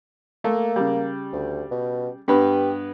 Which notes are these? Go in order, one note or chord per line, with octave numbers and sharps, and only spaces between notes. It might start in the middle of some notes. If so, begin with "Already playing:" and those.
A3 A#3
C#3 G3
D2
B2
G2 B3 G4 B4